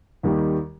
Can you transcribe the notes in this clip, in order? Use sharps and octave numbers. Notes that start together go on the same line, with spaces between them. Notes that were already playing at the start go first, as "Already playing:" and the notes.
D#2 D#3 G3